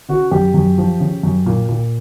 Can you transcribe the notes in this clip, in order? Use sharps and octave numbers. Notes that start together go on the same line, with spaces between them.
C#3 F#4
F#2 G4
F#2
F3
C#3
F#2
A#2
A#2